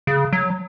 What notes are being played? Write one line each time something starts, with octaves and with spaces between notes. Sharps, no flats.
C#3
F#3